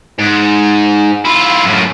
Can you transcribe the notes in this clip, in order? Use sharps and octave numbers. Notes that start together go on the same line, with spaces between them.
G#2
E4 F4
F#2 A2